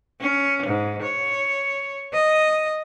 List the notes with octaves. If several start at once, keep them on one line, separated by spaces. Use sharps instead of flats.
C#4
G#2
C#5
D#5